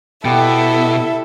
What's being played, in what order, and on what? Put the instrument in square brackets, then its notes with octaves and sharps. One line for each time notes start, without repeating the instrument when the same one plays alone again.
[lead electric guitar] B2 [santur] G3 B3 [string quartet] E4 A4 E5